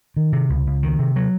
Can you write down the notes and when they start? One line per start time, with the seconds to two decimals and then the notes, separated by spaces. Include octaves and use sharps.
0.16 D#3
0.33 C3
0.49 C#2
0.67 C#2
0.83 D#3
0.99 C3
1.16 F#3